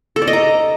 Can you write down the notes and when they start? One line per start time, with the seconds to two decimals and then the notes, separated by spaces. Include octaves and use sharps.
0.16 A4
0.22 D5
0.27 D#5
0.33 A#5